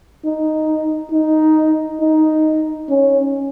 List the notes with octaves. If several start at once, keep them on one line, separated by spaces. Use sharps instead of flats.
D#4
D#4
D#4
C#4